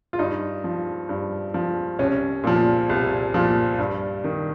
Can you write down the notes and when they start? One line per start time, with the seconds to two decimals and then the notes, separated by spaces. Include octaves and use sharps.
0.13 F4
0.19 G2 D#4
0.64 F3
1.09 G2
1.54 F3
1.99 C2 C#4
2.44 A#2 F3
2.89 C2
3.34 A#2 F3
3.79 G2
4.24 D#3